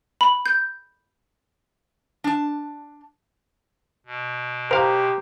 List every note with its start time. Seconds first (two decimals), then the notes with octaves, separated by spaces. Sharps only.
0.21 B5
0.46 G6
2.24 D4 A5
4.06 B2
4.71 G4 A#4 C5 F5 A#5